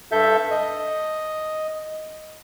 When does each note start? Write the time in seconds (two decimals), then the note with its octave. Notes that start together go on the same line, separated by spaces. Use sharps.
0.12 G2 A4 E5 G6
0.51 D#5